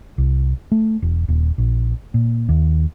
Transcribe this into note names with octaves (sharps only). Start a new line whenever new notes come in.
C2
A3
E1
D#1
A#1
A#2
D#2